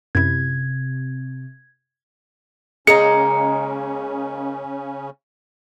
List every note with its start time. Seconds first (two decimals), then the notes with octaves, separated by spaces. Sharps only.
0.15 F#2 C3 E4 G#6
2.87 C#3 G#3 A#3 C#4 D#4 G#4 D#5 C#7